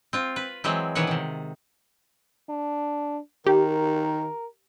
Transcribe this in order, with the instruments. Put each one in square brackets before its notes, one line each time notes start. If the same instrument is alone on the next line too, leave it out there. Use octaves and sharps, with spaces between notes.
[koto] C4 F4
B4
E3 F#3 G#3 C4
B2 D#3 E3 C#5 F#5
C3 D#3
[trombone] D4
[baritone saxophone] D#3 [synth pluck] G4 [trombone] A#4